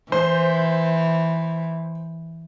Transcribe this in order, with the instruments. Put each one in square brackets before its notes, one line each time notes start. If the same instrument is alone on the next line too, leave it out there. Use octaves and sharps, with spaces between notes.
[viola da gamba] E3 [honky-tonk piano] C5